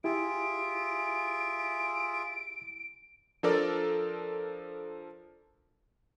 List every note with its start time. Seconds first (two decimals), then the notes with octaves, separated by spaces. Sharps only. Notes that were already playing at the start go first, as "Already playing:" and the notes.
0.04 E4 F4 G4 G#4 E5 D7
3.43 F3 D4 A4 A#4 D5